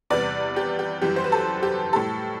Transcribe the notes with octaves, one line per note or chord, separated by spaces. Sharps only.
E2 C3 G3 B4 D5
G4
G4
F#2 E3 G3 G4
C5
B4
A4
G4
A2 G3 A4